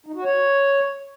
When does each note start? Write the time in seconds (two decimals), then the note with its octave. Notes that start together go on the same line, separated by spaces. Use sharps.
0.06 D#4
0.15 F#4
0.24 C#5